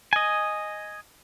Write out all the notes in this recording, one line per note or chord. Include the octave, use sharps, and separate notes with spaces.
D#5 G#5